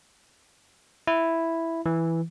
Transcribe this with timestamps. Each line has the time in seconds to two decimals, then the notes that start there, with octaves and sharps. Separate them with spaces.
1.07 E4
1.86 E3